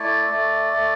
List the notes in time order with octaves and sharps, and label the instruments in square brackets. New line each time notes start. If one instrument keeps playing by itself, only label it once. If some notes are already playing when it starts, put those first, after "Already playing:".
Already playing: [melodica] A3 E4 D5
A3
A3